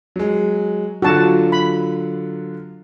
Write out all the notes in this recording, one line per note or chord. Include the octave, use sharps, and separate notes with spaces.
F#3 G#3
D3 F#3 F4 F#4 A5
B5